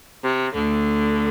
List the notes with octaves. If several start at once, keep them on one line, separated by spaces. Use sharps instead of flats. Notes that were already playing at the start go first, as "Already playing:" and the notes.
C3
D2 D3